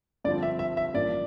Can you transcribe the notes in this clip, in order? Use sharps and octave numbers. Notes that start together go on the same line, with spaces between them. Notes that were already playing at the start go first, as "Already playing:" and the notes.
G2 D3 F3 C4 D5
E5
E5
E5
A1 G2 F3 A#3 D5